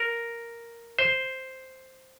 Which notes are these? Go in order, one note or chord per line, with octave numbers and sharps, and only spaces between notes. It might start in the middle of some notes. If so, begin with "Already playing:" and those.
Already playing: A#4
C5